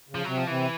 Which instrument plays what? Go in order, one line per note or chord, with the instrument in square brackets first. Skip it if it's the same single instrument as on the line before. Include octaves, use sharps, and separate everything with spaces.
[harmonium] C#3
[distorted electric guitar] F3
[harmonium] C3 [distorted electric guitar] F#3
[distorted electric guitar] F3
[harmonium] C3 [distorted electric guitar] E3